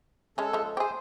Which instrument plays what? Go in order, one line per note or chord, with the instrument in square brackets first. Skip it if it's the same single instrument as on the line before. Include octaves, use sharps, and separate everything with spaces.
[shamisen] G#3 C#4 [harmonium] A4
[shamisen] F3 G#3
[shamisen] G4 G#4 [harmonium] C5